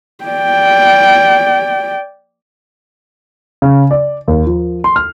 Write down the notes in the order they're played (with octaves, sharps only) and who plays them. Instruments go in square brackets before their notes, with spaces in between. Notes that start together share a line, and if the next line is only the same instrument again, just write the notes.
[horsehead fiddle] D5 G5
[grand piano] C#3
D5
D#2
F3
C6
F6